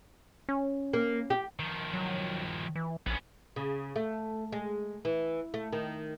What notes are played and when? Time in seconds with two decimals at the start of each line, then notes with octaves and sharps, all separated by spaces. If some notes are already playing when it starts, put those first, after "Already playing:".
0.49 C#4
0.93 A#3
1.30 G4
1.59 D#3 F3
1.94 F#3
2.76 E3
3.07 A#1 B3 C#4
3.56 C#3
3.96 A3
4.52 G#3
5.05 E3
5.54 A3
5.73 D#3